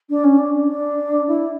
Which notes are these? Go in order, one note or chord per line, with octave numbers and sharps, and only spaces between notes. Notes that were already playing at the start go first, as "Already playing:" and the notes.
D4
C#4
D4
D4
D4
E4